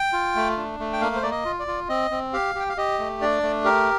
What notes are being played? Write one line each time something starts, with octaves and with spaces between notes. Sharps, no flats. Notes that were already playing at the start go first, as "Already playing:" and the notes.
Already playing: G5
F4
A3
D4
A3
G5
A#3 F5
C5
A#3 D5
D#5
F4
D5
F4
C4 D#5
C4
G4 F5
G4 G5
F5
G4 D#5
A3
D4 D5
A3
G4 A#4